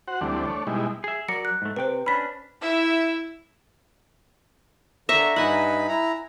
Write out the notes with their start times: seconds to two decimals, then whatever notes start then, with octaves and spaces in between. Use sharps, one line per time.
0.08 F#4 C5 F#5
0.21 D2 E3 G3 A3 C4 D4
0.46 A3 D4 C#5
0.67 B2 G3 G#3 D#4 E4
1.04 G#4 E5
1.29 F#3 A#4 D5 C#7
1.45 F#6
1.62 G#2 A3
1.76 C3 B4 C5 G5
2.06 C#4 D4 B5 B6
2.61 E4 E5
5.09 D3 E5 A#5 C#6
5.36 G2 D#4 F#5 G#5 B5
5.88 E4 A#5